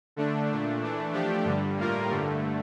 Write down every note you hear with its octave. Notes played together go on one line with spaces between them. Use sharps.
D3 A3 D4
A#2 A3 D4
E3 A3 D4
F3 A3 D4 G4
G2 D3 G3
A2 G3 A#3 F4 A#4
G2 D3 A3